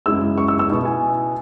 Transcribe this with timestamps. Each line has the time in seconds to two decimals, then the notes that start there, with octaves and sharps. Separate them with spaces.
0.06 F#2 C#3 G#3 E4 E6
0.38 C#6
0.48 E6
0.59 E6
0.70 B2 B3 E4 C#6
0.85 G#5